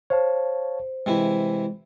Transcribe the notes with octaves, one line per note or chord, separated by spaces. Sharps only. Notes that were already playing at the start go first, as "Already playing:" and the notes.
C5 C#5 F5 A5
C3 E3 G#3 E4